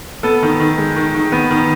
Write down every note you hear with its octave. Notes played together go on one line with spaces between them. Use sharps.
B3 A4
D#3
D#3
G#3
D#3
D#3
B3
D#3